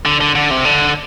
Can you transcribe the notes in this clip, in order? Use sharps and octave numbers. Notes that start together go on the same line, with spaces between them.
D3
D3
D3
C3
D3